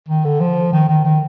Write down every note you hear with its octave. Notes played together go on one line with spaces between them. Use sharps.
D#3
D3
F3
D#3
D#3
D#3